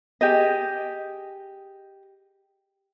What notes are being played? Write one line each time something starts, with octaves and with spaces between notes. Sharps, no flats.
G4 G#4 D#5